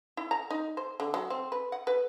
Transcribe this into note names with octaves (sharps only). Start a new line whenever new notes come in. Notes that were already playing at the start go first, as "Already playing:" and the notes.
E4
A#5
D#4
C5
D3
F#3
C4
B4
F#5
B4